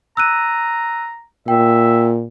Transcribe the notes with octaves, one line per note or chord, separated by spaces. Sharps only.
A#5 E6 F#6 D#7
A#2 E5 G5